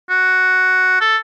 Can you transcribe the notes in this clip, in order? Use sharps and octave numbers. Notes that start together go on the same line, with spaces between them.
F#4
A4